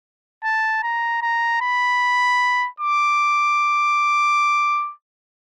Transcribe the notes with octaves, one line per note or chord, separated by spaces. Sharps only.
A5
A#5
A#5
B5
D6